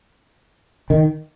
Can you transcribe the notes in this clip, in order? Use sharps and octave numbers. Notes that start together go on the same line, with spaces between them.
D#3